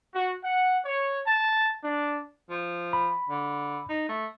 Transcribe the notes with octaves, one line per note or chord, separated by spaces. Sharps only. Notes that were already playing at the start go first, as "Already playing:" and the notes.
F#4
F#5
C#5
A5
D4
F3
B5
D3
D#4
A3